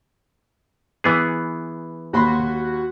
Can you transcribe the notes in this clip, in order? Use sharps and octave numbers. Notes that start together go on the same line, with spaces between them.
E3 B3 G#4
D#2 F#4 B5 C6